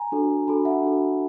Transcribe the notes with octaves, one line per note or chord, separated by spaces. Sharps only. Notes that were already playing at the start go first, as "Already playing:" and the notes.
Already playing: G#5 A#5
D4 F#4 A4
D4 F#4 A4 A5 B5
E5 F#5
D4 F#4 A4